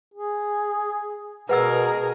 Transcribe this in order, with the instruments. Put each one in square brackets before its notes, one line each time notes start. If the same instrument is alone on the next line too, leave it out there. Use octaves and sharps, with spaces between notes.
[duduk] G#4
[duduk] B2 [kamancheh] G#4 A#4 [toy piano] B4 F#5 E6